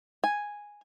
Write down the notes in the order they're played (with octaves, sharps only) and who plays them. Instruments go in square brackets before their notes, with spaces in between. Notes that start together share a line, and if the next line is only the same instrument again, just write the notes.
[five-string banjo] G#5